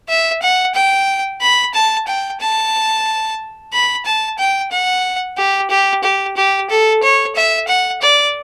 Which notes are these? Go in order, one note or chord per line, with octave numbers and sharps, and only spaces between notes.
E5
F#5
G5
B5
A5
G5
A5
B5
A5
G5
F#5
G4
G4
G4
G4
A4
C#5
E5
F#5
D5